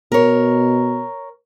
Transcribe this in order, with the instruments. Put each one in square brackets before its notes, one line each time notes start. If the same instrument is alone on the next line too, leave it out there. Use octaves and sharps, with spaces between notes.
[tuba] B2 [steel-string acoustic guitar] A#4 C#5